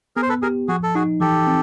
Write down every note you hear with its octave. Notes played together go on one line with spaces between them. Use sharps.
B3 G#4 A#4
C5
A4 B4
G4 G#4 A#4
F3 F#4 G#4
A4
D#4 F#4 G#4
E3 G4 A4
C4